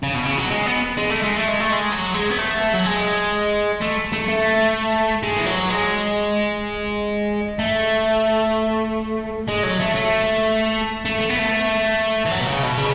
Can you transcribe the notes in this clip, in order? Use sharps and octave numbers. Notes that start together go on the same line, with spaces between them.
C#3
B2
C#3
F#3
G#3
B3
G#3
A3
G#3
A3
G#3
A3
G#3
F#3
G#3
B3
A3
F#3
G#3
A3
A3
A3
G#3
E3
F#3
G#3
A3
G#3
F#3
A3
A3
A3
A3
B3
A3
E3
F#3
B2
C#3
B2
C#3